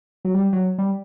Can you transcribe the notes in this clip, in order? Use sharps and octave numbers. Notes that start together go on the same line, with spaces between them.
F#3
G3
F#3
G3